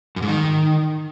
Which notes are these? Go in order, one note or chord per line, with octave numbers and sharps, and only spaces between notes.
F#2
G#2
D#3